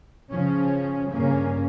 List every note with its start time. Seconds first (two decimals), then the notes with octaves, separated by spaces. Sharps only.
0.31 C#3 F3 C#4
1.12 G2 C#3 A#3 C#4